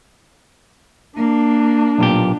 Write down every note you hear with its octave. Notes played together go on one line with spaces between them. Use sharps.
A#3 D4
B1 A#2 G4